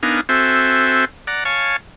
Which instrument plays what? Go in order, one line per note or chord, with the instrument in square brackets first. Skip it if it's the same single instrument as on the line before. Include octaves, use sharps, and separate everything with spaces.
[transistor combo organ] B3 D4 D#4 A#4 F5 G#5
C4 F#4 A4 C5 E5 G#5
D5 F#5 A#5
C#5 F5 G#5 A5 C#6